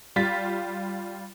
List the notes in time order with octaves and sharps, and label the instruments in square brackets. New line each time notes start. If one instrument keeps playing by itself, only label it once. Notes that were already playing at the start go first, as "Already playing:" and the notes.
[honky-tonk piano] G3 F4 A6 B6